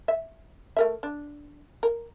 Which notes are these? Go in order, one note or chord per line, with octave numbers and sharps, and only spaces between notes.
E5
A3 A#4 E5
D4
A#4